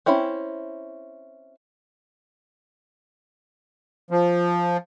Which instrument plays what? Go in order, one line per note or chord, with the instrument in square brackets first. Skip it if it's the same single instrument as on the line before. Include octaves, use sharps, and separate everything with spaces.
[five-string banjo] C4 C#4 E4 B5
[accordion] F3